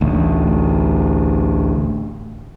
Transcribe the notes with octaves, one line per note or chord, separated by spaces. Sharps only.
A1 D2